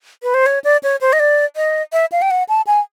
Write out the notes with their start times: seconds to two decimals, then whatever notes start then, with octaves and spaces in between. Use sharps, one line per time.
0.23 B4
0.34 C5
0.46 C#5
0.64 D5
0.83 C#5
1.01 C5
1.13 D#5
1.19 D5
1.56 D#5
1.93 E5
2.12 F5
2.22 G5
2.31 F#5
2.49 A5
2.67 G#5